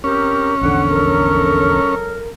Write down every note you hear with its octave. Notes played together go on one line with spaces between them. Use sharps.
C4 C#4 G4 A#4
A#1 E2 D3 F#5
F#3 A4 A#4